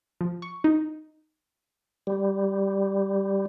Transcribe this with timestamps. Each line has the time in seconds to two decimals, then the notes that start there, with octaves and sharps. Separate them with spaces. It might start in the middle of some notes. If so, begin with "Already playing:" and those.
0.21 F3
0.42 C#6
0.64 D#4
2.07 G3